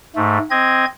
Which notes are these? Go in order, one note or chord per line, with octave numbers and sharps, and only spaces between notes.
G#2 A3
C4 D#5 G#6